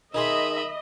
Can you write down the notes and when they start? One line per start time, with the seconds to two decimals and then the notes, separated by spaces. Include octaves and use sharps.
0.14 D#3 D#4 G#4 D#5 E5 B5 C6